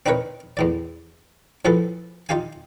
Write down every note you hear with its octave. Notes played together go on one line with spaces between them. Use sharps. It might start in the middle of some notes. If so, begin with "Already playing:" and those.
C4 D4 D#4 A#4 B4 C#5
E2 A2 D5
A2 F3 G#4 A4 B4
D#4 F4 G4 F5 G#5